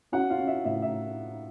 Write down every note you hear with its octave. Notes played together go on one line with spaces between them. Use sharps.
C#4 F#4 F#5
F4 F5
C#4
E5
A2 E5
E5